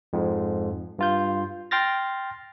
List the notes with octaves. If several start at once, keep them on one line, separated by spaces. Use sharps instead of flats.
F2 G#2
G2 F4 G6
G5 C6 F6 A6 A#6